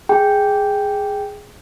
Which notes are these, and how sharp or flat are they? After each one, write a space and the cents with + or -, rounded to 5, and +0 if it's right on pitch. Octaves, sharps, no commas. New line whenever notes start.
G#4 -5 G5 +0